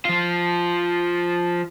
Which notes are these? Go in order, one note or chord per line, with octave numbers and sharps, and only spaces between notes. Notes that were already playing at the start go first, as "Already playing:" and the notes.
F3 F4